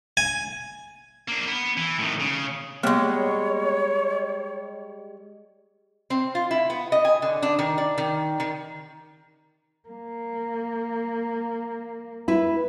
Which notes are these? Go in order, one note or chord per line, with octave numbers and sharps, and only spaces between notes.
G#5
A#3 D4
B3
E3
A2 D#3
C#3
G3 G#3 A#3 B3 C#5
C4
F4
E4
B3
D#5
G#5
D3
D4
D#3
D5
D#3
D#3
A#3
E4 B4